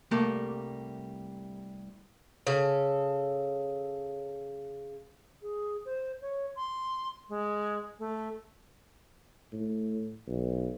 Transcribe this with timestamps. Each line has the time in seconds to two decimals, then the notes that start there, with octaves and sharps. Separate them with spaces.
0.11 C2 G3 A3 A#3 D5
2.47 C#3 A4
5.42 G#4
5.85 C5
6.22 C#5
6.56 C6
7.29 G#3
7.99 A3
9.53 A2
10.27 B1